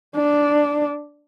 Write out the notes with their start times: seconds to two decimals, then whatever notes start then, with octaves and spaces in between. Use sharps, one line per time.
0.16 D4